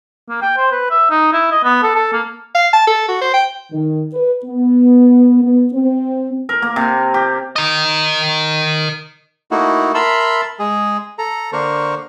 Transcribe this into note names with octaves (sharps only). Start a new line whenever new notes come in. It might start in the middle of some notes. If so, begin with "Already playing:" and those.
A#3
G5
C5
B4
E5
D#4
E4
D#5
B3
A4
A4
A#3
F5
A5
A4
F#4
C5
G5
D#3
B4
B3
B3
C4
A#4
A#3
C3
G4
A#4 D#5
A3 A#3 D#4 E4 F#4
A#4 E5 A5 B5 C6 E6
G#3 G#4
A4 A#5
D3 A#3 D4 A#4 C5 C#6